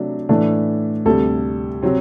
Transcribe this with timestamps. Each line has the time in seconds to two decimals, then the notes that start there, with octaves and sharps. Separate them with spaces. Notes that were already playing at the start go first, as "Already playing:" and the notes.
Already playing: C3 F#3 A3 D4
0.29 A2 E3 A3 D4
1.06 D2 C3 G3 A4
1.83 C3 F#3 C4